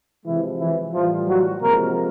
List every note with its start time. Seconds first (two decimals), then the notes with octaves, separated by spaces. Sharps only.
0.24 C3 E3 F3 G#3 E4
0.59 E3 E4
0.93 A2 E3 F3 G3 F4
1.27 F#3 F#4
1.61 C3 F3 G#3 A#3 A#4